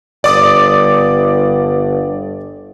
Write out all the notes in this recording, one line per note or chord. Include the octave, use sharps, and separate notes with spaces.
G1 D5 D6 D#6